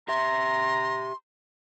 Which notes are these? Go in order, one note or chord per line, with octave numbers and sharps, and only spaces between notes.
G4 E5 A#5 C6